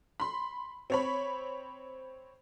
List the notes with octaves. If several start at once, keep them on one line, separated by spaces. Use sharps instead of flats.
B5 C6
C4 C#5 B5